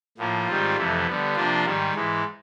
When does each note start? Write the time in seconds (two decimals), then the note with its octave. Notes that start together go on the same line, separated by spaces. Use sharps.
0.17 A2 F3 A#3
0.47 G#2 D#3 G3 C4 F4
0.77 F2 C3 E3 A3
1.06 D3 G3 B3
1.35 C3 F3 A#3 D4 F4
1.65 G#2 D#3 G3
1.95 G#2 E3 G#3